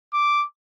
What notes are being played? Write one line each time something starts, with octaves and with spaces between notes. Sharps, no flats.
D6